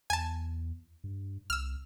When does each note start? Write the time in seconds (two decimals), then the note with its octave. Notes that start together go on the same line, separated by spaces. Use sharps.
0.10 E2 G#5 A5
1.04 G2
1.50 C2 E6 F6